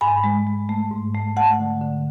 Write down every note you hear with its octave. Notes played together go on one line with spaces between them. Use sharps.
G#2 G#5 B5
G#3
G#3
A3
G#2
A3
A3 F#5 A5
D3
D3